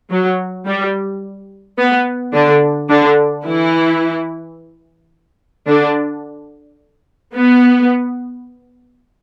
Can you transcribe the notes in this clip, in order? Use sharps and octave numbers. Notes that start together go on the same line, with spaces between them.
F#3
G3
B3
D3 D4
D3 D4
E3 E4
D3 D4
B3